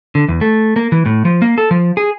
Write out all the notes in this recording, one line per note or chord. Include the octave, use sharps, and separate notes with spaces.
D3
E2
A3
A#3
E3
A2
F3
A#3
A4
F3
G#4